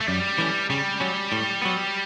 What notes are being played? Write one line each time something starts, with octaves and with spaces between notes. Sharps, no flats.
A3
F#2 G3
E3 A3 C#4
C#3 G3
F#3 C#4
A2
F#3 B3